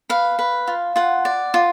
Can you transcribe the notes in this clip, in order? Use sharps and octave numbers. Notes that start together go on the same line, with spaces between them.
B4 F5
B4
F4
F4 F#5
D5
F4